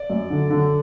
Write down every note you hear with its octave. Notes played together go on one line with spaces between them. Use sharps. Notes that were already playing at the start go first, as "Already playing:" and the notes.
Already playing: D5
F#2
D3
D3